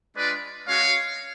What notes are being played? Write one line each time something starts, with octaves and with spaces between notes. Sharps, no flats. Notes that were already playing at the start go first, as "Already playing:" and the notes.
G#3 D4 F4 B4 D5
G#3 C#4 F#4 C#5 F5